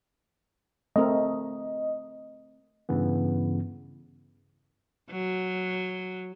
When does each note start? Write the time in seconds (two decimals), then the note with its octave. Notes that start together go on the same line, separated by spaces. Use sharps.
0.96 A3 C4 A#4 D#5
2.89 G2 C#3 E3 B3
5.11 F#3